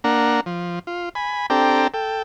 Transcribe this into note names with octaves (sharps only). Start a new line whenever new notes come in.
A#3 D4 F#5 A#5
F3
F4
G#5 B5
C4 D4 G4 A4 G5 A#5
A4 G5